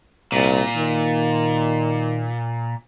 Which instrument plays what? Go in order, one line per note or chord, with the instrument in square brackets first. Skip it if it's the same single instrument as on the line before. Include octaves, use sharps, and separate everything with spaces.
[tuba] C2 [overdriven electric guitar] A#2
[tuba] D#3